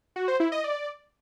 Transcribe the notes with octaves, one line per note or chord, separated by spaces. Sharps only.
F#4
C5
E4
D#5
D5